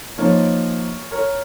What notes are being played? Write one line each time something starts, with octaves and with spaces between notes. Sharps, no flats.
F3 A#3 D#4 A#4 C#5
A#4 C#5